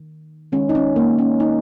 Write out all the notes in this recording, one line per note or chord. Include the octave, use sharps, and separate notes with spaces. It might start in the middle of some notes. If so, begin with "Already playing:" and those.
Already playing: D#3
D#3 G#3 C#4
D#4
C#4
A#3
C#4
D#4